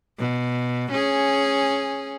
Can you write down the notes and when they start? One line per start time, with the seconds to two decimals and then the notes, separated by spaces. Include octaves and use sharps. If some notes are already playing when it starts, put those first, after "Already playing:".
0.18 B2
0.91 C#4 G#4